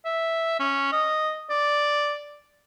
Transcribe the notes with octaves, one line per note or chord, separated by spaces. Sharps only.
E5
C#4
D#5
D5